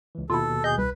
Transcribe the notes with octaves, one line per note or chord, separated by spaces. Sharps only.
C#2 E3
D#2 B2 E4 F4 A4
G#4 D#5 G6
C2 B4